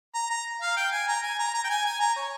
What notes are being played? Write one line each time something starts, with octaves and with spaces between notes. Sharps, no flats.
A#5
A#5
F5
G5
G#5
A#5
G#5
A#5
A#5
G5
G#5
G#5
A#5
C#5